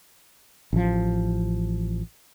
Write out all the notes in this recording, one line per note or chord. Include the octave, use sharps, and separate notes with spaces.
A1 F3